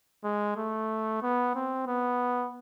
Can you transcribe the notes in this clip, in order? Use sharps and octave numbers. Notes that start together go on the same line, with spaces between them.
G#3
A3
B3
C4
B3